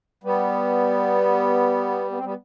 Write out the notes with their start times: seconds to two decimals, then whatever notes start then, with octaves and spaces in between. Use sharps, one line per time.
0.23 G3 B3
2.11 B3
2.18 C4
2.24 G3 B3